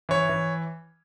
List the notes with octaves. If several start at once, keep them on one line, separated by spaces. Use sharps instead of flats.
E3 C#5
E3